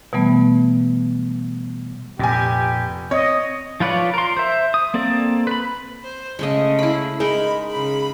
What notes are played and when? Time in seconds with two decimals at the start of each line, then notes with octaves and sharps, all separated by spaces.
0.13 B2 E3 G3 A3 B3
2.20 F1 A#2 G4 G#5
3.11 C4 C#5 D#5
3.80 F3 F4 B4 C#5 D5
4.14 A#4 C6
4.37 C5 E5
4.74 D#6
4.94 A#3 C4 A4 D5
5.47 B4 B5
6.03 C5
6.39 C#3 G#3 A3 D#5
6.79 E4 B5
7.20 G#3 D#4 G#4 A#4 B5
7.70 C#3 B5